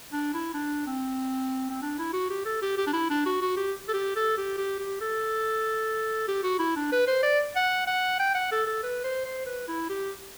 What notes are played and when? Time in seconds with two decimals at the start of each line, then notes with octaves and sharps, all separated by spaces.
0.12 D4
0.34 E4
0.54 D4
0.87 C4
1.70 C4
1.82 D4
1.98 E4
2.13 F#4
2.30 G4
2.45 A4
2.62 G4
2.77 G4
2.87 D4
2.93 E4
3.10 D4
3.26 F#4
3.42 F#4
3.56 G4
3.88 A4
3.94 G4
4.16 A4
4.37 G4
4.57 G4
4.79 G4
5.01 A4
6.28 G4
6.43 F#4
6.59 E4
6.76 D4
6.92 B4
7.07 C5
7.23 D5
7.56 F#5
7.87 F#5
8.19 G5
8.34 F#5
8.51 A4
8.67 A4
8.83 B4
9.04 C5
9.25 C5
9.46 B4
9.68 E4
9.89 G4